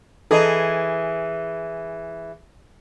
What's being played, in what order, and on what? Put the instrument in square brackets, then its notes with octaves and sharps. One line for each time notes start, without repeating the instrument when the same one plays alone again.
[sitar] E3 G#4 [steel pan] A4 D#5